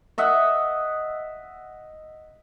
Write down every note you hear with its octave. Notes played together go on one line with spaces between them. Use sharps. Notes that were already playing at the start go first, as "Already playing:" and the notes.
D#5 E5 F#5